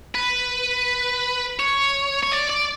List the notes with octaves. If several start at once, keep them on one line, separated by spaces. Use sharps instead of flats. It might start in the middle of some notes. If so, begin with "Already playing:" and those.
B4
C#5
C#5
D5
D5